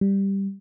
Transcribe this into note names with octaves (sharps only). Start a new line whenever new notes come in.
G3